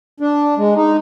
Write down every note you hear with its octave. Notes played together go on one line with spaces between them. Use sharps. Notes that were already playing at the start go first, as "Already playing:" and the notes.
D4
G#3
D#4